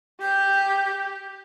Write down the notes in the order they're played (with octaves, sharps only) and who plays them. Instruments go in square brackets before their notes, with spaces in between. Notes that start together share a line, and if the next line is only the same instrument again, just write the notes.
[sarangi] G4 [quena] G6